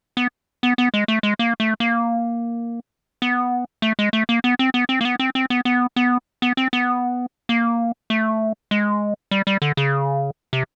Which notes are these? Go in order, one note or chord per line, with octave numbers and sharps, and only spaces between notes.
B3
B3
B3
G#3
A3
G#3
A#3
A3
A#3
B3
A3
G#3
A3
A#3
B3
C4
B3
C4
A#3
B3
C4
C4
B3
B3
B3
B3
C4
B3
A#3
A3
G#3
G3
G3
D3
C#3
C3